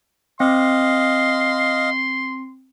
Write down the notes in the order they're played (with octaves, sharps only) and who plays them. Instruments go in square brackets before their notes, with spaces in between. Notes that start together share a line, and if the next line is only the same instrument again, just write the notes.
[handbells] C4 [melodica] D#5 F5 [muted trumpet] C6